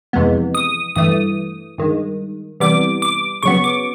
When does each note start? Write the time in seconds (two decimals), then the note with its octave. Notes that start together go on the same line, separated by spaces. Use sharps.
0.13 F2 C3 E3 G#3 B3
0.55 D#6
0.96 G2 E3 A3 D#6
1.78 G2 D#3 G#3
2.60 C3 E3 G3 B3 D6
3.02 D6
3.43 C#3 F#3 B3 C#6
3.64 D6